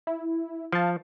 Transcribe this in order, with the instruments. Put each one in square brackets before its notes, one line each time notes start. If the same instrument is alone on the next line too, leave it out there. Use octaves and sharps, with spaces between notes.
[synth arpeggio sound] E4
[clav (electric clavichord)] F3 [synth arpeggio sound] F5 A5